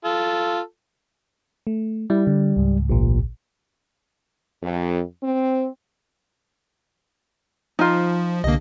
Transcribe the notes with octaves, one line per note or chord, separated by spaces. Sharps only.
F4 A4
A3
G3 E4
D3
C#2 G#2
A1 A#2
F2
C4
F3 D#4 F4
C2 D3 A#3 D#5